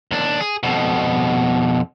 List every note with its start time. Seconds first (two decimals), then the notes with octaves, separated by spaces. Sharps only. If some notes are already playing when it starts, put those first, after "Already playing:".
0.11 D#2 D4
0.40 G#4
0.63 F2 B2